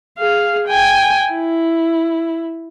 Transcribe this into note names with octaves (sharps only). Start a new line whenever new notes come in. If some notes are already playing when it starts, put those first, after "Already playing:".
G#4 F5
G5 G#5
E4